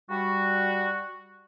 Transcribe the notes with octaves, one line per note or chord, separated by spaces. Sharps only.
G3 F#4